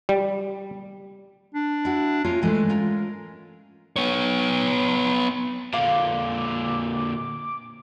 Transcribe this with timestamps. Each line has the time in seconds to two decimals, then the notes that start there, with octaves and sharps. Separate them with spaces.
0.09 G3
1.55 D4
1.85 E4 F#4
2.24 A#3 C#4 F4 A#4
2.42 G#2 E3 G#3 A3
2.69 C#4 F4 A#4
3.96 B3 C#5
5.73 A#2 D3 F5 D6